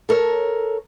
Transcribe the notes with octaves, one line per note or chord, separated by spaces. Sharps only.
A4 A#4 C#5